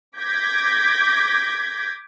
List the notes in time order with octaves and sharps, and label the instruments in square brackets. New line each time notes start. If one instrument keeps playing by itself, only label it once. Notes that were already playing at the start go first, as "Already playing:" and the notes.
[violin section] D6 G6 G#6 A#6 B6